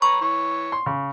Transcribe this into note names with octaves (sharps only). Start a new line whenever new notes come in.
B4 C#5 A#5 C#6
E3 C#5
C6
C#3